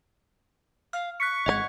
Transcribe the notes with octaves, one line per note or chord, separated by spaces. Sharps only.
F5 F6
C#6 F#6 B6 C#7
G#1 C3 G#3 D#5 F#5 G#6